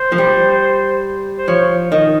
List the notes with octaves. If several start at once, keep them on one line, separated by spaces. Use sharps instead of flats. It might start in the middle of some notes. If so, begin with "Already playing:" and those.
Already playing: C5
F3
G3
C5
F3 C#5
D#3 D#5